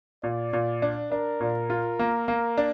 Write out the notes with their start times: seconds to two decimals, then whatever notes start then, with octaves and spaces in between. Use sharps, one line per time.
0.23 A#2 D5
0.53 A#2
0.82 D4
1.12 D4 A#4
1.40 A#2
1.70 F4
1.99 A#3
2.28 A#3
2.58 D4